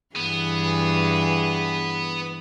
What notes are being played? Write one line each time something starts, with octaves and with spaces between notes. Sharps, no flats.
G2 E3 B3 G#4